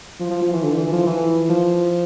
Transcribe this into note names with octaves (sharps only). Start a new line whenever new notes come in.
F3
F3
F3
E3
D3
E3
F3
E3
F3